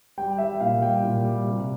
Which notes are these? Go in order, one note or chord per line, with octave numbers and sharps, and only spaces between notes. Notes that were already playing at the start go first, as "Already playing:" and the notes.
G3 G5
G3 E5
A#2 F5
G3 G5
A#2
G3
C3